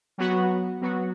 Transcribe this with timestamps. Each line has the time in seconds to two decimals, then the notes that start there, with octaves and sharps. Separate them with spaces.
0.18 F#3 B3 F#4
0.81 F#3 B3 F#4